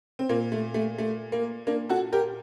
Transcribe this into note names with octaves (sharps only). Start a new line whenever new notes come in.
C4
A#2 A#3
A3
A3
A3
A#3
A#3 D4
F#4 A4
G4 A#4